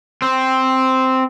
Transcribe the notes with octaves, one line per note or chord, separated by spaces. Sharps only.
C4